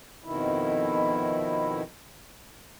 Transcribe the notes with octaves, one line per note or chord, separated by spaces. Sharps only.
F2 B2 D#3 E4